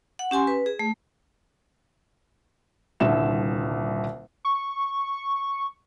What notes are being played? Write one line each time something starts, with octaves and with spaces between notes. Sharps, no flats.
F#5
C#4 G4 G#5 C6
B4
G#4
A3
D#1 C2 D3 E5 E7
C#6